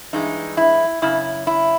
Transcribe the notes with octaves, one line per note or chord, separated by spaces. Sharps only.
G2 E3 G#3 D#4
E4
F#2 C#3 E4
E4